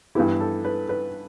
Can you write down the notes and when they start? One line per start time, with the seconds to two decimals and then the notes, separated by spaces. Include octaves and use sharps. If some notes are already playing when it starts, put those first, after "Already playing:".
0.15 G2 E3 B3 E4 G4
0.40 A4
0.65 B4
0.89 B4